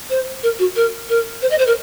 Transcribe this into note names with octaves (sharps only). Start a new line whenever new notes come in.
C5
A#4
F#4
A#4
A#4
C5
D#5
C5
A#4